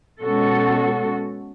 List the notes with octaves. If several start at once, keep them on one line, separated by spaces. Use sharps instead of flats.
B2 G#3 C#4 F#4 A4